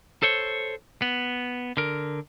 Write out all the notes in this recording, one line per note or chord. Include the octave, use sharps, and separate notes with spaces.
A4 C5 C#5
B3
D3 A#4